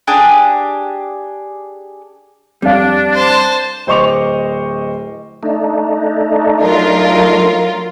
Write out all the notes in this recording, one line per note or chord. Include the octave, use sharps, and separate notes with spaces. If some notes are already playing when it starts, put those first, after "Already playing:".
D4 G4 G#4
F2 G3 D4 F5
C5 A5
D1 C5 D#5 C#6 D6 F7
A3 D4 D#4
F#3 F4 A#4